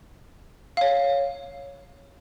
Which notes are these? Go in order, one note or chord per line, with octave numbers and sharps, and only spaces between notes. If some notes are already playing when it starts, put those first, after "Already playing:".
C#5 F5